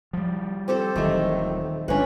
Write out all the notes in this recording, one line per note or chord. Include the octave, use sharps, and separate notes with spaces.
F3 G3
C4 G4 A4
D#1 D#3 E3 F#3 A3
G1 G#3 C#4 D4 B4